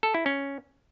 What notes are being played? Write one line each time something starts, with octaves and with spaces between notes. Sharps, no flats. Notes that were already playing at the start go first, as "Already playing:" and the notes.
A4
E4
C#4